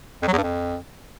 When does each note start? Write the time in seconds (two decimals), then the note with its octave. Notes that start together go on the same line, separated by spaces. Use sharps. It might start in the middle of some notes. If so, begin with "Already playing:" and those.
0.22 F2
0.28 F#3
0.33 E2
0.38 G2
0.43 F2